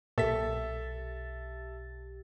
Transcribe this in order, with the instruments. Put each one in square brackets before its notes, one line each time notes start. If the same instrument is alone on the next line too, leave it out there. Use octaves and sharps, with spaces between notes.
[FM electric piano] B1 G4 A6 [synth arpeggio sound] A#2 B6 [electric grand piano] A4 E5